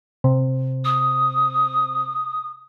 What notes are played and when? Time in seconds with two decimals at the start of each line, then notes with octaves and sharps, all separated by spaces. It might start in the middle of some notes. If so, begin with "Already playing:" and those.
0.24 C3
0.85 D#6